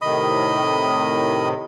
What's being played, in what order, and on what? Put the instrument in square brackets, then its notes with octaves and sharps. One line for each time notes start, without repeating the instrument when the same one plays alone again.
[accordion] A2 C3 D#3 [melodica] D#5 B5 D#6